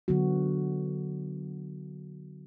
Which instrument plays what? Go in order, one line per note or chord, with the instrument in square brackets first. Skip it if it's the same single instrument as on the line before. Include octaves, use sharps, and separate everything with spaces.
[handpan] D3 F#3 B3 F#4